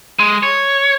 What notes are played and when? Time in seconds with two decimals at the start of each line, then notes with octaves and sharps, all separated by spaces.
0.19 G#3
0.43 C#5